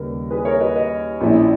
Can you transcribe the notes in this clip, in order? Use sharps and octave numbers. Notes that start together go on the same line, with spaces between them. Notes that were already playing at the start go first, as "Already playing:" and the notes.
Already playing: D#2 C#3 G3 A#4 B4
G#4 B4
A#4 C#5
B4 D#5
B4 D#5
A#1 A#2 A#3 C#4 E4